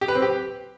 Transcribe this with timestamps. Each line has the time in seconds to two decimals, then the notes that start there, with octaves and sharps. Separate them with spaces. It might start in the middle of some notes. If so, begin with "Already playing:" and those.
0.01 G4
0.08 B4
0.15 C4
0.22 G4